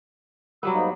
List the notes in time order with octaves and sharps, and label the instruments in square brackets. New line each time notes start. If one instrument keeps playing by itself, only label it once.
[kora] F#3 G3 B3 [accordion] E6
[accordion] G#2 A#3 D#4